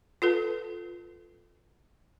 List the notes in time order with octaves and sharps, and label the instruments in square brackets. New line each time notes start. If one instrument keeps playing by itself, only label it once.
[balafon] F4 A4 B4